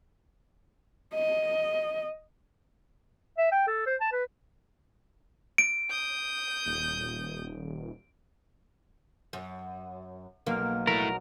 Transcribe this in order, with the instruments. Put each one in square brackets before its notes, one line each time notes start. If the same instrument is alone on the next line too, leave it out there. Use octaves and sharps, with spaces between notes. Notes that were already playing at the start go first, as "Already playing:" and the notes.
[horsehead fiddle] D#5
[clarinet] E5
G5
A4
C5
A5
B4
[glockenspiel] D7
[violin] D#6 G6
[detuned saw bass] D#1
[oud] F#2
[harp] B1 A#4 F6 [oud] A#3
[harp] F#3 [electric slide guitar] A3 E4 [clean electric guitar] A#4